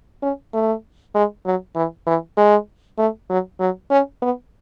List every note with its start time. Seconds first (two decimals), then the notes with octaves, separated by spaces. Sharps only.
0.22 C#4
0.54 A3
1.14 G#3
1.46 F#3
1.76 E3
2.06 E3
2.37 G#3
2.98 A3
3.29 F#3
3.60 F#3
3.91 C#4
4.22 B3